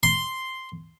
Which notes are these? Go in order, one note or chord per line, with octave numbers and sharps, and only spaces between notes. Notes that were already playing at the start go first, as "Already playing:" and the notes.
C6